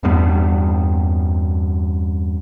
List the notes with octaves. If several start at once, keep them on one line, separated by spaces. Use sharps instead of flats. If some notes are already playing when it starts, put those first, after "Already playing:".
E2 G2 G3 B3